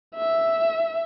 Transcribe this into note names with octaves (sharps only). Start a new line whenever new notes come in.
E5